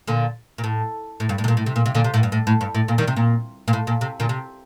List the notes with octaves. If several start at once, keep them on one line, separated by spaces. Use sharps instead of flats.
A#2 D3
A#2
A2
A2
G2
A2
C3
A#2
A2
C3
A#2
C3
A#2 D3
C3
A2
G2
A2
A2
G2
A2
A#2
D#3 G3
C3
A#2
A#2
A2
A#2
C3
A#2 D3
C3